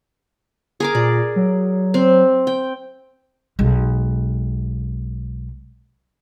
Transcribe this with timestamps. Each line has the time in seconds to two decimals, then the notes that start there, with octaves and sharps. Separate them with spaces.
0.80 G#4 A#4 D6
0.95 A#2 D5
1.36 F#3
1.94 C4
2.47 G5
3.59 B1 G#3